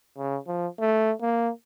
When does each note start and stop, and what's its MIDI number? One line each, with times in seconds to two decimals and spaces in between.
0.18 0.38 49
0.48 0.67 53
0.80 1.13 57
1.21 1.50 58